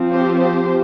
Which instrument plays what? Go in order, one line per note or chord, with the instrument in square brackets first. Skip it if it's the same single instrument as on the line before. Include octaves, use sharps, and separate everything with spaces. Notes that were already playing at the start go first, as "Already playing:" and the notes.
Already playing: [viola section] F3 C4
G4 C5
G4 C5